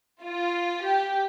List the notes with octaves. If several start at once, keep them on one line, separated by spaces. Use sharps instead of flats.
F4
G4